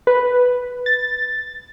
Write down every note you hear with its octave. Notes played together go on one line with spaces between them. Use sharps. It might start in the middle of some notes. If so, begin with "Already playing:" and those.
B4
A6